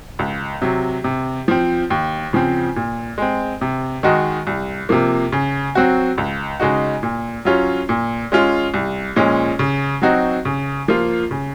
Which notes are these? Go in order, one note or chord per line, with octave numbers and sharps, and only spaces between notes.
C#2
C3 F#3
C3
F3 C4
D#2
C#3 F3 C4
A#2
G#3 C4
C3
D#3 G#3 D#4 F#4
C2
C3 F3 A#3
C#3
F#3 C4 F#4
C#2
C#3 G#3 D#4 F#4
A#2
F#3 C#4 F4
A#2
G#3 C#4 F4
C2
A#2 F3 G#3 C#4
C#3
F#3 C4 D#4 F#4
C#3
F3 A#3 F4
C#3